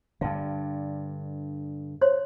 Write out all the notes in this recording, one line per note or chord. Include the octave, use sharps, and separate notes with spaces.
G2 D3 F5
C5 C#5 C6